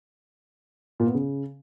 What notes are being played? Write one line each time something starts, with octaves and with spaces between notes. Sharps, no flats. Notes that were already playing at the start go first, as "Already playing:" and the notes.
A#2
B3
C#3